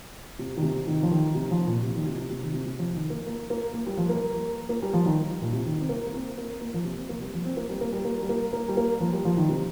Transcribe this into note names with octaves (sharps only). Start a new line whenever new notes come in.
C3
D#3
C3
D#3
F3
D#3
C3
F3
A#2
C3
D#3
C3
C3
C3
D#3
C3
C3
F3
D#3
A#3
A#3
A#3
A#3
G3
F3
A#3
A#3
G3
F3
D#3
A#2
C3
D#3
C4
A#3
A#3
C4
A#3
A#3
F3
C3
C4
A#3
G3
F3
C4
A#3
G3
A#3
G3
A#3
G3
A#3
A#3
G3
A#3
F3
G3
F3
D#3
C3